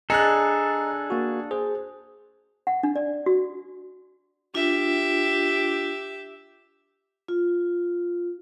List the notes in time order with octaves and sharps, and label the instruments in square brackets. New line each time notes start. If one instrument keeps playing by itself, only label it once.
[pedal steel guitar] D4 A4 [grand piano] G#4 F#6 [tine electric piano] D#5 A#5 C#7
[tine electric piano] A#3 F#4
G#4 C5
[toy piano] F#5
D4
D5
F#4
[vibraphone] D4 F4 [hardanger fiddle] G4 E5
[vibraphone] F4